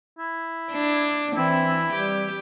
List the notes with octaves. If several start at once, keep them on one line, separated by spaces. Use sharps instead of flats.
E4
D4
E3 C4 E4
G3 G4